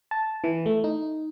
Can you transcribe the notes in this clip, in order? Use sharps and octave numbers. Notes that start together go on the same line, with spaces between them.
A5
E3
A3
D#4